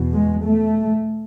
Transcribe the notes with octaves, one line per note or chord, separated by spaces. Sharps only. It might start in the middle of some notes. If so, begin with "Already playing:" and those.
Already playing: E2 B2
G#3
A3